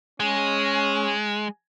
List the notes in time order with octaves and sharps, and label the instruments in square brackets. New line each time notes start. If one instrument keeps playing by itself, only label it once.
[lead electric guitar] G#3 [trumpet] C#4